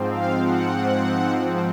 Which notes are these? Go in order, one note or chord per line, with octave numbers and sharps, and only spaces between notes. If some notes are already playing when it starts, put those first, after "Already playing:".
Already playing: G#2 F3 C4
F5
F#5